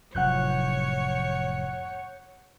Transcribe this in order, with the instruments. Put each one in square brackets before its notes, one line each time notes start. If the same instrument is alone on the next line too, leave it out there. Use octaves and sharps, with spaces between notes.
[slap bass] F1 A2 F#3 [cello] C#5 [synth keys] F#5 F#6 G6